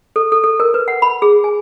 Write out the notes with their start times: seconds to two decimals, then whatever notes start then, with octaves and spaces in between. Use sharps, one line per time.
0.16 A4
0.32 A4
0.44 A4
0.60 A#4
0.74 B4
0.88 F#5
1.02 B5
1.22 G#4
1.44 G#5